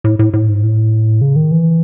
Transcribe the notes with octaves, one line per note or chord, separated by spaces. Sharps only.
A2
A2
A2
G#2
A2
C#3
D#3
E3